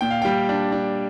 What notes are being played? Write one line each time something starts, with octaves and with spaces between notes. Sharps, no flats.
A#2 G5
F5
G3 G5
D4
D4